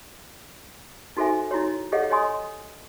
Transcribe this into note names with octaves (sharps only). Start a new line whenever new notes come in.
D#4 F#4 A4 C5 E5 G#5
D#4 E4 F#4 C#5
G4 A4 C#5 D#5 F5 F#5
C#5 D#5 G#5 C6 D#6